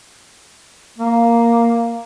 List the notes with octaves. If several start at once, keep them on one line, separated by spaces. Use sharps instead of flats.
A#3